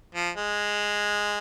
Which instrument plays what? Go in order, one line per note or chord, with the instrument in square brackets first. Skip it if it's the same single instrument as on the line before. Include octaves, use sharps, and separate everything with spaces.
[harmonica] F3
G#3